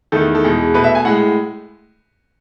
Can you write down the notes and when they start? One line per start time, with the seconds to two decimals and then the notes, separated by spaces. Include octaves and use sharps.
0.12 E2 D#3 A3 A4
0.35 A4
0.44 E2 B2 G#3
0.74 B2 A3 B4
0.84 E5
0.95 G#5
1.05 A2 G#3 F#5